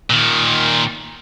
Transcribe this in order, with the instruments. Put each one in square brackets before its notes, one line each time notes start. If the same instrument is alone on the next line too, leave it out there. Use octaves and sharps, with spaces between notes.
[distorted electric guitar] A#2 D#3